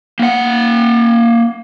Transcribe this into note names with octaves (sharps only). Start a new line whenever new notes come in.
A#3 F#5